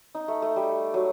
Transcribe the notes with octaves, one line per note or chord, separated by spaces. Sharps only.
D#4
A3
A3
G3
F#3